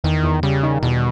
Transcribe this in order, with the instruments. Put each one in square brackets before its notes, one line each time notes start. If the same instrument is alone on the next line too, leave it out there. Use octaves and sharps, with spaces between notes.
[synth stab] E2 [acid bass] D#3
[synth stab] E2
[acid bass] C#3 [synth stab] G3
[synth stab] D#3
[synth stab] E2 [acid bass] B2